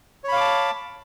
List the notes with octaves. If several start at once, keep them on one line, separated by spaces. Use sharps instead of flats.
C#5 F5 A5 B5 D6